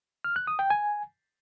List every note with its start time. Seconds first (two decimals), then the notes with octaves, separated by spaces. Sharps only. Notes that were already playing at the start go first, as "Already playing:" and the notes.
0.24 F6
0.36 F#6
0.47 D#6
0.59 G5
0.70 G#5